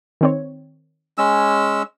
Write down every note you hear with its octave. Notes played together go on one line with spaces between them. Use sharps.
D#3 C4 C#5
G#3 C#4 E6